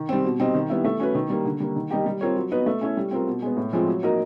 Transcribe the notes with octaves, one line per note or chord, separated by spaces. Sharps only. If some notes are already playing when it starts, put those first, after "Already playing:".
Already playing: D#3
G3 C4
B2
G3 C4 D#4
D#3
G3 B3 E4
A3
C#4 F#4 B4
D#3
G3 A#3
D3
G3 A#3
D#3
G3 A#3 D#4 G4
G3
C4 F4 A#4 C#5
F#3
B3 D#4 F#4 B4
A3
C#4 E4 A4 C#5
G3
C4 F4 A#4
B2
G#3 B3
A2
F3 G#3 C4 F4
F#3
A#3 D#4 F#4 A#4